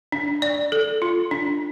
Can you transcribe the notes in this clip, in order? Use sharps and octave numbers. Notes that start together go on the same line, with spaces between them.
D4
D5
A4
F4
D4